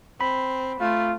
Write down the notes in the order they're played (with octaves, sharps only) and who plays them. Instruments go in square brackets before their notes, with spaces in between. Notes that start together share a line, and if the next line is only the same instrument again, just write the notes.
[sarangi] C4 [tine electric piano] B5
[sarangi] A3 [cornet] F4